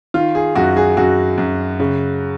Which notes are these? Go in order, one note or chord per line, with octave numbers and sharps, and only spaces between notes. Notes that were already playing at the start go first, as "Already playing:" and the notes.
D#3 F4
G#4
F#2 F#4
G#4
F#2 F#4
F#2
C#3